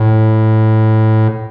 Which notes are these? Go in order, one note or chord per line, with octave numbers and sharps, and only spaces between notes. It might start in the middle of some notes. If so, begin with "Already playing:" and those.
Already playing: A2